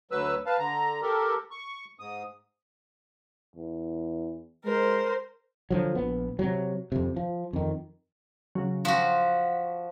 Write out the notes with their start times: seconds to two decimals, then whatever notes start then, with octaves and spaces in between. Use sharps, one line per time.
0.11 D2 F#3 B4 E6
0.46 B4 F5 A5
0.59 D3 A#5
1.02 G4 A4 A#4
1.51 C#6
1.99 G#2 D#6
3.56 E2
4.65 G#3 A#4 C5
5.70 D3 F3 F#3
5.95 A#1 B3
6.39 C3 F#3
6.92 F2 C3
7.16 F3
7.53 F2 D#3
8.55 C#3 F#3
8.85 F3 F#4 F#5 B6